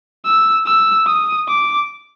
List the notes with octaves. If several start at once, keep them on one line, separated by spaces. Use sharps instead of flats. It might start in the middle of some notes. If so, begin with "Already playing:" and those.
E6
E6
D#6
D6